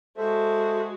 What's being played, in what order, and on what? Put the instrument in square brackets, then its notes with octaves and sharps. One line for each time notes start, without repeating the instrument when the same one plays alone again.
[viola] G#3 F#4 [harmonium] A4 C5 E5